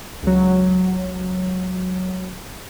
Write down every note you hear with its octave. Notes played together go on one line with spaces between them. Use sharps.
C#2 F#3